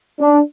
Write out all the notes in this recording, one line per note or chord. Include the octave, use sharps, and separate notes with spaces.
D4